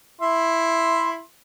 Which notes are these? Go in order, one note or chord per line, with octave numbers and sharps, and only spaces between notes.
E4 E5 C6